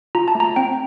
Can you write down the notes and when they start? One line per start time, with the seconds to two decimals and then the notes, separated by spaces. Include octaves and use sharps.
0.15 F4 A#5
0.28 A5
0.35 A3
0.40 A#5
0.56 C4 G5